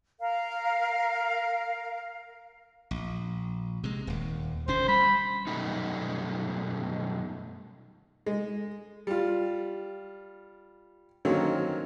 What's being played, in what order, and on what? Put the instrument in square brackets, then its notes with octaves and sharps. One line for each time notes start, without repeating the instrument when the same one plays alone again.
[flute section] A#4 F5
[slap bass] A#1
C3 G#3
D#1 D#2
[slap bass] E1 D3 C#4 [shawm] C5
[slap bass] G3 [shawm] B5
[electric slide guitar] F#2 B2 G3 A3 C#4 D#4
[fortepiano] G#3
G3 F4
D3 D#3 F#3 A#3 C4 C#4